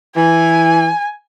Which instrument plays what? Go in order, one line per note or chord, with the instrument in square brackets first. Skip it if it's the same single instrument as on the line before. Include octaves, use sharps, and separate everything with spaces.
[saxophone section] E3 [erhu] G#5